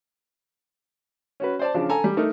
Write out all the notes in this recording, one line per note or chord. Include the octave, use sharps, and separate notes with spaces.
C#4 F#4 B4
C5 D5 A5
C#3 F3 D4
A4 G#5 A#5
G3
A3 D#4 A#4